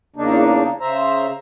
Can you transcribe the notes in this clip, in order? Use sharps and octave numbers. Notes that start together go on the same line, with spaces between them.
E2 C#3 A#3 D4 D#4
C#3 C5 E5 A#5